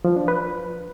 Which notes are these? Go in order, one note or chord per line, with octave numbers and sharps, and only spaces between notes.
F3
D4
B4